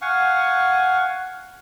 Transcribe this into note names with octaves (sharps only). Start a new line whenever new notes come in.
F5 F#5 G#5 C#6